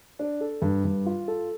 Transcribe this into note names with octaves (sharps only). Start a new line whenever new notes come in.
D4
A4
G2
G2
F4
A4